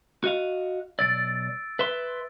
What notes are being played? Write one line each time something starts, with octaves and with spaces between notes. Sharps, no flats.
F#4 D#5 F5
B1 D5 E6 A6 D7
B4 E5 C6